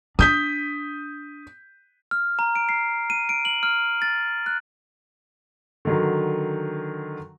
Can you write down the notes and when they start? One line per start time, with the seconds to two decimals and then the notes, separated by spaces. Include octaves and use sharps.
0.19 D4 D#6 G6 B6
2.11 F6
2.39 A#5
2.56 D7
2.69 C7
3.10 D#7
3.29 D7
3.45 F#7
3.63 F6
4.02 A6
4.46 F#6
5.85 D3 D#3 F#3